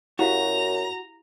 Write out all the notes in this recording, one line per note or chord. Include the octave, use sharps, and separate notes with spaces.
F#2 E4 F#4 G4 F5 A#5